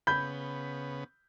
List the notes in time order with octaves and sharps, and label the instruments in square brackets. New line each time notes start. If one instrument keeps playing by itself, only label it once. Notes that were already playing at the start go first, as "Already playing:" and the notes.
[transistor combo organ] C#3 B3 [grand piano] B5 [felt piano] G6